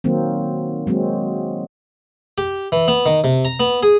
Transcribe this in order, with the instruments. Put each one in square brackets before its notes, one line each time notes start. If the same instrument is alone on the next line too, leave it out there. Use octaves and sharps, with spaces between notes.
[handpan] D#3 F#3 A#3 C4
F#3 G#3 A#3 C4
[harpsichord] G4
E3
B3
D#3
C3
A#5
B3
G#4